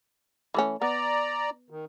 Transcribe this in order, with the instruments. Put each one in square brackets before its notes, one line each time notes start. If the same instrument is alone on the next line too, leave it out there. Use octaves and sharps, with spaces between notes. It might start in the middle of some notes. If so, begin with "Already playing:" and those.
[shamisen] E3 A3 C#4
[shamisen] B3 [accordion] D5 A#5
[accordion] D#3